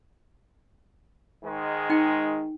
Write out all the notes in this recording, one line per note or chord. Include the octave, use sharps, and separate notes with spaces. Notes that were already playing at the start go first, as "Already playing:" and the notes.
G#2 D#3 G#3
D#4 G5